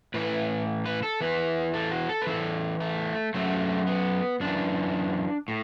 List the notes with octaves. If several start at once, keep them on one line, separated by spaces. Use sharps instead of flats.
A2 E3 B4
B4
A4
E2 E3 B4
A4
F#4
A4
B4
E2 E3 A4
A3
F#2 F#3 A3
B3
F#2 E3 D4
A2